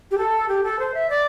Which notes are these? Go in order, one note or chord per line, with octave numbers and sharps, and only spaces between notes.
G4
A4
G4
A4
C5
E5
D5